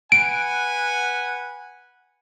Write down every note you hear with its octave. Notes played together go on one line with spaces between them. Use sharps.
B4 F#5 G#5 D7